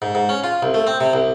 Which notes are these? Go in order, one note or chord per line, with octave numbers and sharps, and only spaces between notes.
G#2
G#2
C#4
F4
C2
A3
C4
C3
C2